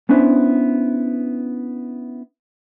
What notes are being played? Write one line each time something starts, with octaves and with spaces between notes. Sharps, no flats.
B3 C#4 D4 E4 B4 C5